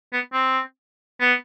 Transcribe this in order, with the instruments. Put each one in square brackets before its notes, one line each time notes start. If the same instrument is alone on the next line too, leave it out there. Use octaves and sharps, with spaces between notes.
[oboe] B3
C4
B3